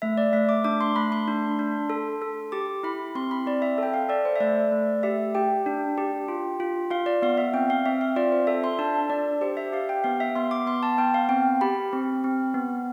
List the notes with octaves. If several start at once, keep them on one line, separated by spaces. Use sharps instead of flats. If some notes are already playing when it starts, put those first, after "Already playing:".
A3 E5
D5
A3 E5
D6
D4 D6
C6
A3 B5
C6
D4
D4
A4
A4
G4 D6
E4 B5
C4 C6
B5
C4 D5
E5
A4 G5
F5
A4 D5
C5
E5
A3 D5
A3
G4 E5
G4 G5
D4
G4
F4
F4
F4 F5
D5
B3 F5
E5
C4 G5
F5
C4 E5
F5
F4 D5
C5
A4 E5
C6
D4 A5
D4 D5
G4 C5
E5
G4 F5
G5
B3 F5
E5
B3 C6
D6
B3 C6
A5
B3 G5
F5
C4 G5
G4 B5
C4
C4
B3